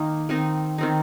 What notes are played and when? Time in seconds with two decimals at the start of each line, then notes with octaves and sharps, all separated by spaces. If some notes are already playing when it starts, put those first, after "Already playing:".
Already playing: D#3 A#3 D#4
0.29 D#3 C4 D#4
0.78 D#3 C4 D#4